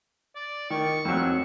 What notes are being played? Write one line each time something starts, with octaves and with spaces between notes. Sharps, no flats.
D5
D#3 C#6
F2 F#3